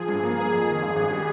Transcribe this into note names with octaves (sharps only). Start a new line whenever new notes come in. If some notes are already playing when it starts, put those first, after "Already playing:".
Already playing: F3 G#4
G2
A#3
A#3 G#4
F2
D#3
G#1
G#1
G3